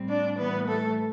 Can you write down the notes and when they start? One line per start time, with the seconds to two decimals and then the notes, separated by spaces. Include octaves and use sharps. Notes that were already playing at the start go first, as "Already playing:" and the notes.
Already playing: A2 G3 C4
0.08 D4 D5
0.38 A2 E3 G3 B3 B4
0.68 A3 A4